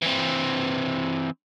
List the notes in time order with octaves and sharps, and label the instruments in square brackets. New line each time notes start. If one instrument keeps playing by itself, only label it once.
[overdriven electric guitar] E3 C4